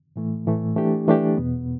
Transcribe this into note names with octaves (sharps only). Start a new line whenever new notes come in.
A2 E3 A3
A2 E3 A3
E3 A3 D4 G4
E3 A3 D4 G4
E2 B2 B3